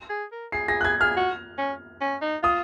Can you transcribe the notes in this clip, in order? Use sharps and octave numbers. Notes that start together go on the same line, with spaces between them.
G#4
A#4
G#4 C7
G#4 A#6
F#6
G#4 G#6
G#4 F6
F#4
C#4
C#4
D#4
F4 D#6